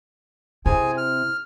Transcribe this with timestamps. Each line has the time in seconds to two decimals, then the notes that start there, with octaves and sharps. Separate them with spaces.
0.66 C3 E4 G#4 G#5
0.98 F6